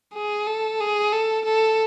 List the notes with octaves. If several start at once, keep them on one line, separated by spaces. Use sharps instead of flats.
G#4
A4
G#4
A4
A4